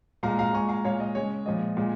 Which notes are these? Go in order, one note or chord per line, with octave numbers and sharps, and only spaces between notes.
A#2 G#3 F5 A#5
F5 A#5
A#2 G#3 G#5 C#6
F5 A#5
A#2 G#3 C#5 F5
D#5
C#3 G#3 C#5
A#2 F3 G#3 D#5
A#2 G#3